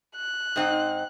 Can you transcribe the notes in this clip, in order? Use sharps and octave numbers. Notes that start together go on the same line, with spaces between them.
F#6
G#2 C4 D#4